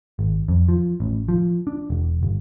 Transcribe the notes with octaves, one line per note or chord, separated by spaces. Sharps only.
G#1
F2
F3
A1
F3
D4
E1
G1